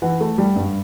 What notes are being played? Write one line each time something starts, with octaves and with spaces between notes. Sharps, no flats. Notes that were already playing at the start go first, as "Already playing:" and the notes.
E3 F#5
A3
G3
G2